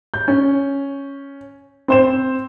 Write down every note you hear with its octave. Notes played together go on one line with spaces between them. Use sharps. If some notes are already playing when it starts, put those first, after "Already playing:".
G6
C#4
C4 C5 E7